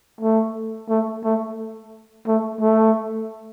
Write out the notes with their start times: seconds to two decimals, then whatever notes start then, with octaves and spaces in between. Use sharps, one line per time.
0.21 A3
0.89 A3
1.24 A3
2.26 A3
2.61 A3